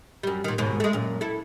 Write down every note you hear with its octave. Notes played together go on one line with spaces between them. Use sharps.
F#2 G3
A#2 D#3
D#2 G#2 B2
G#3 A3
F#2 A#2
E4 A4